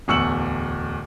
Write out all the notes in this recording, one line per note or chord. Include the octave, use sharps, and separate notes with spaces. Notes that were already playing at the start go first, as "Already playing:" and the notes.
D1 E2 C#6 E6 C#7 F#7